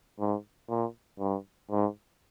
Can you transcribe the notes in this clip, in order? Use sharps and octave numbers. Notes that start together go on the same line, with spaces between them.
G#2
A#2
G2
G#2